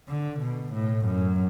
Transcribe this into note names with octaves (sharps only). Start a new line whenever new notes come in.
D3
B2
A2
F#2